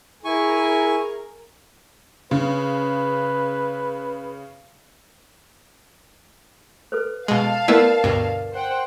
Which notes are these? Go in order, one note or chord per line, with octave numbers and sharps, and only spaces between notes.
E4 G#4 A#4 G#5 C#6
C#3 B4
A4 B4 C5
B2 G#3 F5 A5
A3 B3 E4 A#4 B4 D5
D2 G2 B2
C5 F#5 G5